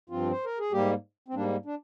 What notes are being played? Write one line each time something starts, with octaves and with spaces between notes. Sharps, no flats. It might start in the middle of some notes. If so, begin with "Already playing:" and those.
G2 F3 C4 F4
C5
A#4
G#4
G#2 G3 A#3 G4
C4
G#2 G3 A#3 D4
D4